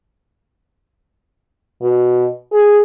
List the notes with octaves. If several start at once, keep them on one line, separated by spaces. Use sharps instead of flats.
B2
G#4